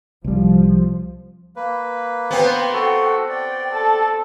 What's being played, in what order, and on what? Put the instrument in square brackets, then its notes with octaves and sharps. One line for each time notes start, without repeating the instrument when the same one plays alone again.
[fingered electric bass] C2 G3 [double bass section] F3
[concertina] A#3 B4
[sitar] B3 C4 [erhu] G5
[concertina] F#4 A4
[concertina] D5 [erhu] G5
[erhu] A4